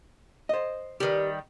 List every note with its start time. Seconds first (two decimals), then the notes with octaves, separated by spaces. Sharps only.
0.49 C5 D#5
1.00 D#3 G3 G4 B4